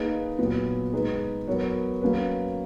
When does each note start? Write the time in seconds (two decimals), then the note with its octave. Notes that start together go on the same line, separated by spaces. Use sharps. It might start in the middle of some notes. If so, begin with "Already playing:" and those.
Already playing: A#3 D#4 G#4 B4
0.39 A#2 F#3 B3
0.93 G#3 D#4 G#4 B4
1.48 F#3 B3 F#4 A#4 C#5
2.02 F#3 A#3 C#4 F#4 B4